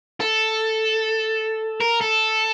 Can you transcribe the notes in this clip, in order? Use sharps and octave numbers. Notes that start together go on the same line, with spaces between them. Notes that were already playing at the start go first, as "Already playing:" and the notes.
A4
A#4
A4